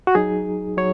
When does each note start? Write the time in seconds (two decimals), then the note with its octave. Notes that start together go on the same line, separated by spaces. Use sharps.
0.07 F#4
0.15 F#3 D#4 G#4
0.77 F#3 C#5